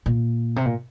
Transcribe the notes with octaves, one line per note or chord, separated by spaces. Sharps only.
A#2
C3
A#2